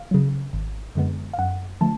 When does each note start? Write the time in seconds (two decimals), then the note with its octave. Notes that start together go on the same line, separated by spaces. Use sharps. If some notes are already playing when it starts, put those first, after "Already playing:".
Already playing: F5
0.11 C#3 F#3
0.53 G#1
0.95 F#2 D3 G#3 B3
1.33 F5
1.38 F#2 F#5
1.81 D3 F3 A3 A5